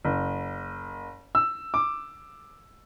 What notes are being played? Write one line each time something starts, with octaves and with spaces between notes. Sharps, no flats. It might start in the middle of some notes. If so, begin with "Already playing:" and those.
F#1
E6
D6